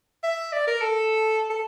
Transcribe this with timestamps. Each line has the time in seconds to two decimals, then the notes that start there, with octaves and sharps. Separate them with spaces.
0.23 E5
0.52 D5
0.67 A#4
0.81 A4
1.50 A4